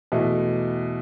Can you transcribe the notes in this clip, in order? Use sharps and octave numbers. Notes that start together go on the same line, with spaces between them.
E2 B2 A3 E4